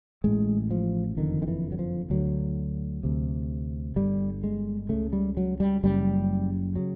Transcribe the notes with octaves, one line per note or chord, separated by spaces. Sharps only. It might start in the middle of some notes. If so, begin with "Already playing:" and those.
A1 A2 G#3
F3
F#1 F2 D3 D#3
D#3
E3
F#3
F3
D2 D3 F#3
D2 C3
G1 G2 D3 G3
G#3
C#2 C#3 A3
G3
F#3
G3
F#1 F#2 C#3 G3
C#3 F#3